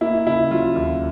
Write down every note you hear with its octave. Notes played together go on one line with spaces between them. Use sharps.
A#3 E4
C#3 E4
F#3 F4
D#2